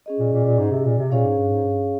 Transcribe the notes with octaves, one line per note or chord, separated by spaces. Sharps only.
C#4 G#4 D#5
A#2
A#2
A#2
G#2
C3
A#2
C3
A#2 C#4 G#4 C#5 F5
G#2
G2
G#2
G2